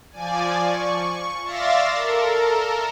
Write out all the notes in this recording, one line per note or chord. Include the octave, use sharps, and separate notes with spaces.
F3 D5 G#5
C#6
D5 E5 F5 C6 A6 A#6
A4 A#4